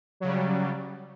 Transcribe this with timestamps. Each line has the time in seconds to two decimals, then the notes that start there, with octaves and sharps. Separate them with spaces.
0.20 F#3
0.24 C#3
0.27 G3